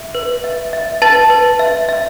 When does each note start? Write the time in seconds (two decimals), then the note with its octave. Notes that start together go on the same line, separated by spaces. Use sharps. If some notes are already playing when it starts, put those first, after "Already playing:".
Already playing: E5
0.15 B4
0.44 E5
0.73 E5
1.02 B4 A5 A6
1.30 B4
1.59 E5
1.89 E5